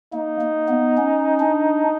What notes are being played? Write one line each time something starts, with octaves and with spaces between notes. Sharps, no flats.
A#3 D#4
A#3
B3
C#4
D4